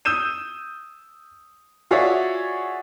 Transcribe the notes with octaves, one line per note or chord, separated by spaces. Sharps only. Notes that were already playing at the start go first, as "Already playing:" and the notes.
D#6 E6 G6 D#7 E7
F4 F#4 G#4 C#5 D5 E5